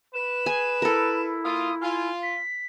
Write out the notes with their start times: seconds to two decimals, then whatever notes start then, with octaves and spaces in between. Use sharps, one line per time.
0.14 B4 E7
0.46 G#4 G#5
0.82 E4 A4 A#4
1.44 A#3 F4 D#6
1.82 F4 G#5
2.23 B6